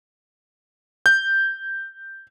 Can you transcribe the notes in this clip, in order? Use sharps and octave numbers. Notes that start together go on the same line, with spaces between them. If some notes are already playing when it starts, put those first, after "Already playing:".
G6